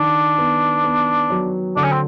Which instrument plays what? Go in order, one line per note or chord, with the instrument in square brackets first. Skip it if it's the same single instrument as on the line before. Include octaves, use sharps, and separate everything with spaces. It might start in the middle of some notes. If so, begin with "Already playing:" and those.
Already playing: [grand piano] D#3 [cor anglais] D4
[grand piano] B3
B3
F#3
[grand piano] D3 [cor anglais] D4
[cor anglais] C#4
C4